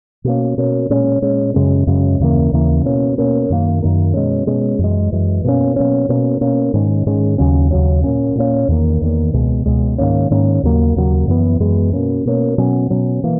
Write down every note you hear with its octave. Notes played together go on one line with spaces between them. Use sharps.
B2 A#3 C#4
B2 A#3 C#4
A#2 G#3 C#4
A#2 G#3 C#4
F#2 C#3 G#3 C#4
F#2 C#3 G#3 C#4
D#2 C#3 E3 A#3
D#2 C#3 E3 A#3
B2 A#3 C#4
B2 A#3 C#4
F#2 D#3 A#3
F#2 D#3 A#3
B2 G#3 C#4
B2 G#3 C#4
F#2 E3 G#3
F#2 E3 G#3
B2 F#3 A#3 C#4
B2 F#3 A#3 C#4
B2 A#3 C#4
B2 A#3 C#4
G#2 D#3 G#3 C#4
G#2 D#3 G#3 C#4
D#2 C#3 F#3 C#4
D#2 C#3 F#3 C#4
A#2 A#3 C#4
A#2 A#3 C#4
E2 D#3 A#3
E2 D#3 A#3
C#2 B2 G#3
C#2 B2 G#3
G#2 D#3 A#3 C#4
G#2 D#3 A#3 C#4
D#2 C#3 F#3 A#3
D#2 C#3 F#3 A#3
F#2 E3 G#3 B3
F#2 E3 G#3 B3
B2 A#3 C#4
B2 A#3 C#4
B2 F#3 C#4
B2 F#3 C#4
E3 A#3